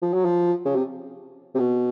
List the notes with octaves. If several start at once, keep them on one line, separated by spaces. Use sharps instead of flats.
F3
F#3
F3
C#3
C3
C3
B2